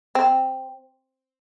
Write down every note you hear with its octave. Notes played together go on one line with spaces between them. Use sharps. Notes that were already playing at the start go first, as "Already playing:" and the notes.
C4